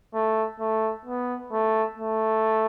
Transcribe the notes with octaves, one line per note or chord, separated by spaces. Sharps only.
A3
A3
B3
A3
A3